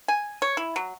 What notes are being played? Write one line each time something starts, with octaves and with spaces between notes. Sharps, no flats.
G#5
C#5
E4
F#3